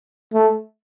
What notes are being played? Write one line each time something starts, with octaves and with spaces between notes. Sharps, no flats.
A3